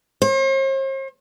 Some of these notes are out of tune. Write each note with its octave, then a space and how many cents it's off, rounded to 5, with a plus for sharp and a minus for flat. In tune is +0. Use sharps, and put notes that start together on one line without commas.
C5 +45